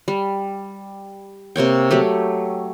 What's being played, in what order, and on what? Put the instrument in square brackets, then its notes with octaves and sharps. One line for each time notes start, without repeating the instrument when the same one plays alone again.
[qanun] G3
C3 A#3 C#5 G5
F#3 A3 G4